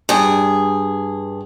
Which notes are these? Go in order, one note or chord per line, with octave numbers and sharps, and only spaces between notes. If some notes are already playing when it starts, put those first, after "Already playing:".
G2 G#4